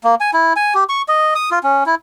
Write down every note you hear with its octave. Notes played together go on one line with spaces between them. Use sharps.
A#3
G#5
E4
G#5
G4
C#6
D#5
D#6
F4
C#4
E4